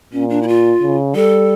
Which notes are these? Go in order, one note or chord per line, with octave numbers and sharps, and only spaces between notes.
A#2 C#4
D4
E4
F4
C#3
G3 A4